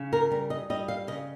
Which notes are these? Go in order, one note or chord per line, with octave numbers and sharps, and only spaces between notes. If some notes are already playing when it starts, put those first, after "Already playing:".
Already playing: C#3
A#4
G3 A#4
D#5
G3 D#5
F5
C#3 D#5